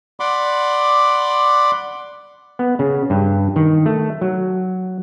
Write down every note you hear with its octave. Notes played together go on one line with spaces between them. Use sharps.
D5 F#5 B5 C6 D6
B3
C#3
G2
D#3
A3
F#3